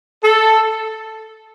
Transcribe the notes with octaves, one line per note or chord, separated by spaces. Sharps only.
A4